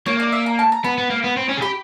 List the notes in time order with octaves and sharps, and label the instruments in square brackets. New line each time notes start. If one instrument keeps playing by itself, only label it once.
[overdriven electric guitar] A#3 [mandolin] C#5
[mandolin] D5
E5
A#5
A5
A#5
[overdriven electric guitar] B3 [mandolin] B5
[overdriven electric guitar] B3
A#3
B3
C4
C#4
G#4
[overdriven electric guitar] G4 [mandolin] B5